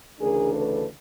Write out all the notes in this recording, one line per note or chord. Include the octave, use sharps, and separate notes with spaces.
D2 C#3 E3 A3 D4 G#4 A#4
A4 B4